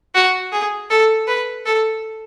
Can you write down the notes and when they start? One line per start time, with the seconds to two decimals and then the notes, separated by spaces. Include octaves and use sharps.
0.14 F#4
0.52 G#4
0.90 A4
1.27 B4
1.66 A4